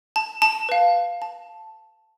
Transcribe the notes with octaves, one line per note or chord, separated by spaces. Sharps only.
A5
A5
B4 F5
A5